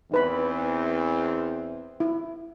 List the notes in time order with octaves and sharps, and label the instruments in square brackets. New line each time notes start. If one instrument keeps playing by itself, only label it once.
[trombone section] E2 C4 [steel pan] D#4 B4 B5
[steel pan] E4